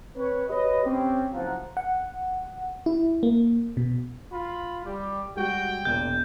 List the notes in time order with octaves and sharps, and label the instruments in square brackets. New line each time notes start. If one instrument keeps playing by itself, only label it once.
[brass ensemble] C4 B4 C#5
G4 B4 C#5 D#5
C4 C#4 G4
F#1 F3 C5 F5 F#5 A#5
[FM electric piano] F#5
E4
A#3
B2
[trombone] F4 [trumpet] B5
[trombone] G3 [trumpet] G4
[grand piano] G3 G#3 [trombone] F#4 [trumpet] G5
[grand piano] E1 [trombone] A#2 [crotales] G6